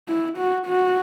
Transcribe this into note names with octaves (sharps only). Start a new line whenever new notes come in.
E4
F#4
F#4